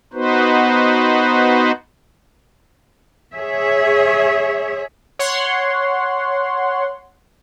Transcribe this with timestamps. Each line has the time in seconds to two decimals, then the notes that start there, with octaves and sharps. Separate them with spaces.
0.13 B3 D#4 F#4 B4 C5
3.35 G#4 C#5 E5
5.19 C#5 F#5 C6